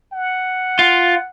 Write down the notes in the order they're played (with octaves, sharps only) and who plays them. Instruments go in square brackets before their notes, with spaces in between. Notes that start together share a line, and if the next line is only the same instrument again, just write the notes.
[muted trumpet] F#5
[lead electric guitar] F4